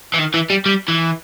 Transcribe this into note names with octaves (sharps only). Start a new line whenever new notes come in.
E3
D#3
E3
G3
G3
E3